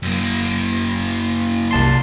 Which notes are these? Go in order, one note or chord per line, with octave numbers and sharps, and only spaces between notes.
F#2 A#3
C2 A5 C6